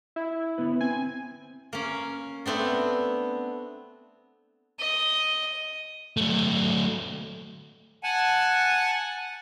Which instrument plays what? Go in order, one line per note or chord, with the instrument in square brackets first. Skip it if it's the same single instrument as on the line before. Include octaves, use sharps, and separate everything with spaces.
[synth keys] E4
[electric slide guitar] D3 B3 B4
[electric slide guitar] C4 [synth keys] G#5
[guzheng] A#3 C#4
A3 B3 C4 D4
[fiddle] D#5
[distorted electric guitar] F#3 A3
[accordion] F#5 G#5 A5